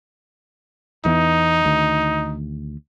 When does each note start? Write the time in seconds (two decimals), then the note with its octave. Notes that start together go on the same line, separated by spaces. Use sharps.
1.05 E2 E3 B3 D#4
1.65 D2 D#3